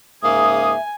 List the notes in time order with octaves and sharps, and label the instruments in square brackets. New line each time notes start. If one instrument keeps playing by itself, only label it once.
[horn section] G#2 C#3 A#3 [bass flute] E5 [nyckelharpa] G#5 [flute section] D#6